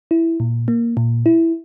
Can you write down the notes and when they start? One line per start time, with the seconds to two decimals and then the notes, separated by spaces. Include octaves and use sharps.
0.11 E4
0.40 A#2
0.68 A#3
0.97 A#2
1.26 E4